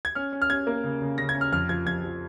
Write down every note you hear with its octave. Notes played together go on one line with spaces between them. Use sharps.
G#6
C#4 F6
C#4
F6
C#4 G#6
A#3
C#3
C#3
C#3 A#6
G#6
C#4
F6
F2 F6
F3 G#6
F2 G#6
F3